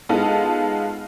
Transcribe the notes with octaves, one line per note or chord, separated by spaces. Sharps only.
G#3 B3 D#4 F4 A4